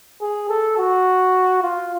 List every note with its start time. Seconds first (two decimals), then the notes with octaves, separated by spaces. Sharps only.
0.21 G#4
0.49 A4
0.78 F#4
1.63 F4